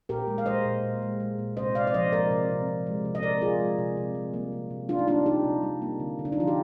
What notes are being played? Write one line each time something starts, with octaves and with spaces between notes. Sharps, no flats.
A#2 G4 A#4
G#3
F5
G#3 C5 D#5
A#2
A#2
G#3
G#3
A#2
C3 C5 D#5
C3 D5 F5
D5
F3 C5 D#5
G#3 A#4 D5
C3
C3
F3
G#3
C3
D#5
C3 A#4 D5
F3 F4 G#4
G#3
C3
C3
G3
A#3
C3
C3
G3 D4 F4
D#4
A#3 D4 F4
C3 D#4 G4
C3
G3
A#3
D3
D3
D4
D#4
F3 F4
G4